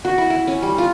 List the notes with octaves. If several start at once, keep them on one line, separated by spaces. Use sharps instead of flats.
F#4
E4
E4
C#4
G3
F4